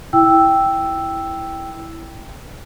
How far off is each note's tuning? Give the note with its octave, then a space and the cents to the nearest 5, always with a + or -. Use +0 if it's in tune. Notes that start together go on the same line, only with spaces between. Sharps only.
E4 +0 G5 +0 E6 +0